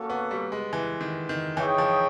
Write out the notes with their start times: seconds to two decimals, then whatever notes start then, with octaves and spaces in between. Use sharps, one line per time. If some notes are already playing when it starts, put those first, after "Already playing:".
Already playing: A#3 C#4 F#4 A4
0.10 B3
0.31 G3
0.52 G#3
0.73 E3
1.01 D#3
1.29 D#3
1.57 E3 D#4 G#4 C#5 E5 G5
1.78 F3